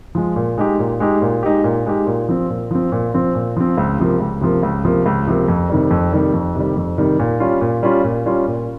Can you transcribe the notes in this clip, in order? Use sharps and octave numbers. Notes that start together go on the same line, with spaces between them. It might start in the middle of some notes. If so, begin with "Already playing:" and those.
F3 G#3
A#2
G#3 D#4 G4
A#2
G#3 D#4 G4
A#2
G#3 D#4 G4
A#2
G#3 D#4 G4
A#2
F3 C4
A#2
F3 C4
A#2
F3 C4
A#2
F3 C4
C#2
C3 F3 A#3
C#2
C3 F3 A#3
C#2
C3 F3 A#3
C#2
C3 F3 A#3
F2
C3 D#3 G3
F2
C3 D#3 G3
F2
C3 D#3 G3
F2
C3 D#3 G3
A#2
G3 C#4 F4
A#2
G3 C#4 F4
A#2
G3 C#4 F4
A#2